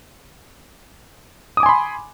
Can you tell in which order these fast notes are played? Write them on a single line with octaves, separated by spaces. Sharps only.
D#6 D6 G#5 C6 B5